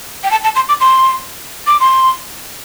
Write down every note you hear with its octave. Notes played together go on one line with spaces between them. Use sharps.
G5
A5
A5
C6
D6
C6
D6
C6